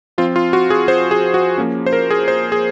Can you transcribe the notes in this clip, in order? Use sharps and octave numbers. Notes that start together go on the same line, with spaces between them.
F3 C4 F4
F4
F#4
G#4
C5
G#4
F#4
F3 A#3 C#4
C5
A#4
G#4
C5
G#4